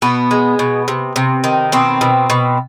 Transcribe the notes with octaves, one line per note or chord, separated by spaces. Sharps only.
B2 B3
G#3
B2
C3
C3
D#3
B2 C4
B2
B2